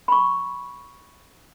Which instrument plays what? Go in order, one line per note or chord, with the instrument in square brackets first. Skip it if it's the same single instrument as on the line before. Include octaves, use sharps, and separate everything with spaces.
[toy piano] B5 C#6